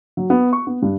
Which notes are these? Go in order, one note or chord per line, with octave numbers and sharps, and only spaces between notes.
F#3
B3
C#6
B3
G2